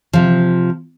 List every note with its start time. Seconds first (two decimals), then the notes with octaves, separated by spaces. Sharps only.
0.13 C3 F3